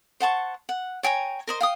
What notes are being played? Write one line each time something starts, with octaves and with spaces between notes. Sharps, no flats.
C5 F#5 A5 C#6
F#5
C#5 G5 G#5 A#5
A#4 C5 D#5
F5 G5 D#6